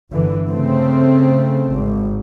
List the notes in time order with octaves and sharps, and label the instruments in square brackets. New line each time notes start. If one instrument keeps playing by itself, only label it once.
[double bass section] G1 D3 E3
C#3 A3 C4
G#1